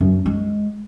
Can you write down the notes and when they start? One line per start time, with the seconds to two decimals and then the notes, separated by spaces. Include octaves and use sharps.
0.01 F#2
0.26 G#3